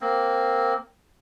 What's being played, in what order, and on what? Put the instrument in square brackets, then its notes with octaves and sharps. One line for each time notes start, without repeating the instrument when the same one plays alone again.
[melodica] A#3 C4